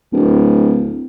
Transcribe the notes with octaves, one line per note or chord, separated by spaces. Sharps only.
D1